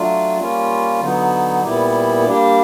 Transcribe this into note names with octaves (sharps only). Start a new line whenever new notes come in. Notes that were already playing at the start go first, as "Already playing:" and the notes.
Already playing: F#3 A3 D4 F4
G3 A#3 C#4 F4
D3 F#3 B3 D#4
A#2 G3 B3 E4 G4
G3 A#3 D4 G4